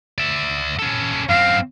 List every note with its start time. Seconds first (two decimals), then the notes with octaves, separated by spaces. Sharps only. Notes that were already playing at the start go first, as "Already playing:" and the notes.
0.18 D5 E5
0.79 C#4 A4
1.29 F#2 C4 F5